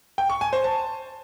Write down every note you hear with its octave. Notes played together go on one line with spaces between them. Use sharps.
G5
C#6
G#5
C5
A5